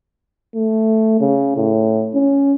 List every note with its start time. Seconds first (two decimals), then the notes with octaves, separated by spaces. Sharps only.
0.55 A3
1.20 C#3
1.56 A2
2.14 C#4